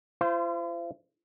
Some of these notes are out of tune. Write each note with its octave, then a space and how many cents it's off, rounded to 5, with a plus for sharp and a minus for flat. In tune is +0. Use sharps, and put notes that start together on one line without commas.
F4 -45 C5 -20